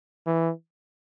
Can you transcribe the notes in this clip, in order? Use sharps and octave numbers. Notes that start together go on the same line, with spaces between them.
E3